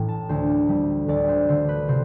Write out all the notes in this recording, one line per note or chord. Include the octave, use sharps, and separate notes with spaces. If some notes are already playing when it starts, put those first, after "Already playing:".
Already playing: A1 A2 G5
A5
D2 C5
G3
D2 D5
C5
D3 C5
B4
C3 C5